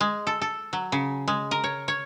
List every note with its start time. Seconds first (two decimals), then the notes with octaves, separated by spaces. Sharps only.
0.01 G#3
0.27 A4
0.41 A4
0.73 F#3
0.92 C#3
1.28 G#3
1.51 A#4
1.64 C#5
1.88 C#5